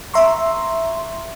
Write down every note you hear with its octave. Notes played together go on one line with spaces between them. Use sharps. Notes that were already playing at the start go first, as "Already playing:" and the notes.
E5 A#5 C6 C#6